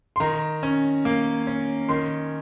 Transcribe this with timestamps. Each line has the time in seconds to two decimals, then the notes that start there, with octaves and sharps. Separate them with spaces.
0.16 C6
0.20 D#3 A#5
0.63 C#4
1.05 A#3
1.47 C#4
1.89 D#3 C6